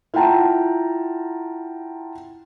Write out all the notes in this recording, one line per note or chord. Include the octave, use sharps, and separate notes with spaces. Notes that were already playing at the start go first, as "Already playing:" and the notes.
E4 F4 F#5 G5 A5 A#5